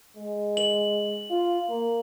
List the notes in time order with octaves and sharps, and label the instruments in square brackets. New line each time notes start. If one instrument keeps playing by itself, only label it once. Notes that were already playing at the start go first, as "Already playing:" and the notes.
[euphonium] G#3
[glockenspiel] F#7
[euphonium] F4
A#3